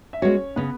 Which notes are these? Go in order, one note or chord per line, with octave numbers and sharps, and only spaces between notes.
E5
G#3 B3 C#4 F#4 C#5
C#3 B3 B4